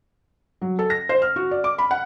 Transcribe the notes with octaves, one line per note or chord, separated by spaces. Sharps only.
F#3
A4
A#6
C5
F6
F#4
D5
D6
B5
F#5